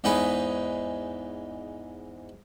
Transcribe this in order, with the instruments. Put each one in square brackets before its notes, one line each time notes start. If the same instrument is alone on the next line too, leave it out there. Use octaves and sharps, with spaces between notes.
[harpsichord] E2 G#2 D#4 G#4 B4